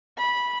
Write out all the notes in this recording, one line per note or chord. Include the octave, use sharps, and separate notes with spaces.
B5